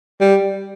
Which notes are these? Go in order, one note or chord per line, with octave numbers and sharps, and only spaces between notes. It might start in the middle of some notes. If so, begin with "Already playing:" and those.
G3